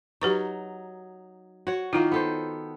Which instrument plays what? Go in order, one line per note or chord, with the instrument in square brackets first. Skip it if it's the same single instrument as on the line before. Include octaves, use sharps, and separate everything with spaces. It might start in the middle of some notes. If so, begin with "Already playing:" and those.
[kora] F#3 D#4 [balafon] G4 B4 C#6
[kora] F#4 C#5
[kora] D#3 A#3 [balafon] E4 F4
[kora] B3 A4 C5